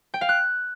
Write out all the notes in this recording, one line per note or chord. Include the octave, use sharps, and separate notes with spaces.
G5
F5
F#6